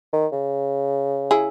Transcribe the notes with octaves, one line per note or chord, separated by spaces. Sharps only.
D#3
C#3
E4 G#4